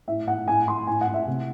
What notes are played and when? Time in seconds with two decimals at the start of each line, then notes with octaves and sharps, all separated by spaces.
0.08 A2 E5
0.27 A2 F#5
0.47 A2 G#5
0.67 A2 C6
0.87 A2 G#5
1.01 F#5
1.08 A2
1.14 E5
1.27 C3